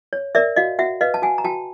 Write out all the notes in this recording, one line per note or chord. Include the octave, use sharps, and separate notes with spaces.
C#5
A#4 D5 E5
F#4 D#5 F5
F#4 E5 F#5
B4 D#5 F5
A5
F#4 F#5 G#5
A#5
F#4 G5 A5